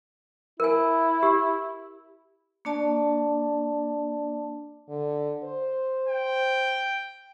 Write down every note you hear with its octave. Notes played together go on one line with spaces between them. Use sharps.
E4 A#4 G#5
G4
A#3 D4 D5 A5
D3
C5
G5